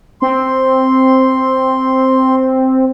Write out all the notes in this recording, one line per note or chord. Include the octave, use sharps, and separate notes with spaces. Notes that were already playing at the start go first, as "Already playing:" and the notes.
C4 C6